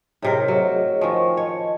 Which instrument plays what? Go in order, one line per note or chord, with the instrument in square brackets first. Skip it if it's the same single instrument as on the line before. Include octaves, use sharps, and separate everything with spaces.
[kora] A2 C3 A#4 [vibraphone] G#4 C#5 D#5
[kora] F#3
[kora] D#3 F3 [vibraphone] C5 G#5 C#6
[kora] C#5 [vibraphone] D#5 A5